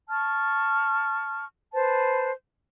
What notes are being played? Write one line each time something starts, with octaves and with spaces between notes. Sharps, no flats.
A5 C#6 F6
B4 C5 A5